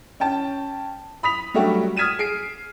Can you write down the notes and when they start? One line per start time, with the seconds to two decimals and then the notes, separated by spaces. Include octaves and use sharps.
0.20 C#4 G5 A5
1.23 B5 D#6 B6 F7
1.54 F#3 G3 A3 D4 F#4 G4
1.96 D#6 F6 G#6 B6 D#7 E7
2.19 G#4 C7 D7